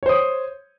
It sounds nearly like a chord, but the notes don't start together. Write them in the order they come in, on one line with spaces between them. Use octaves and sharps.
C#5 C5 D#6